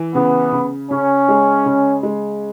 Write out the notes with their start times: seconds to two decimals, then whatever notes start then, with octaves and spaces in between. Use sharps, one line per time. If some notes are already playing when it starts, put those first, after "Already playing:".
Already playing: E3
0.14 C#3 B3
0.52 C#3
0.90 C#3 C#4
1.29 G#3
1.66 C#3
2.03 G#3